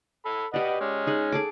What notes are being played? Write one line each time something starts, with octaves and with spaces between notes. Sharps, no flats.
A4 B5
G4 B4 D5 D#5 F#5
G#3 C#4
D#4 G#4 F#5
G#4 A4 D6